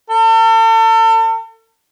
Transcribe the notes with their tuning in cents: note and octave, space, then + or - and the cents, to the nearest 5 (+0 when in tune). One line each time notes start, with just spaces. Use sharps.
A4 +40